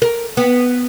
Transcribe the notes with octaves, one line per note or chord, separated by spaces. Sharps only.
A#4
B3